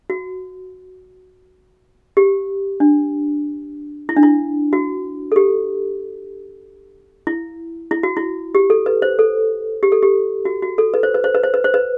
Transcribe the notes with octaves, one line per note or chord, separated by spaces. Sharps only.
F#4
G4
D4
E4
D4
E4
F#4
A4
G4
E4
E4
F#4
E4
G4
A4
B4
C5
A4
G4
A4
G4
F#4
F#4
A4
B4
C5
B4
C5
B4
C5
B4
C5
B4